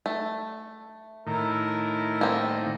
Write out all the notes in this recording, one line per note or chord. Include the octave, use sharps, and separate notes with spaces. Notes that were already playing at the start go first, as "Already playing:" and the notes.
A3
A2 D#3 E4 A#4
A#3 C4